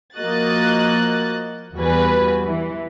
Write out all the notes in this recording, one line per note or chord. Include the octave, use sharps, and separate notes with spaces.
F3 A#3 F#4 D#5 F#6 A6
E2 G3 F#4 B4 G#5
E3